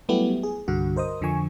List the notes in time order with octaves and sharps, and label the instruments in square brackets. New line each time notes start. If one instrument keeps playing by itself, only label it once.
[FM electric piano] F#3 G3 A3 B3 E4 G4
G#4
C2 G2 D3 F#4
A#4 C5 D#5 D#6
F2 D3 F3 G#5 C#6